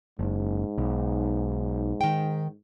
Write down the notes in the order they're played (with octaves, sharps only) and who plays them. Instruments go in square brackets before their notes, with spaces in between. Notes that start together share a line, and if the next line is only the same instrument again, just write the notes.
[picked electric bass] F#1 [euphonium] G#2
[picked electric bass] B1
[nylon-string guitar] D#3 G5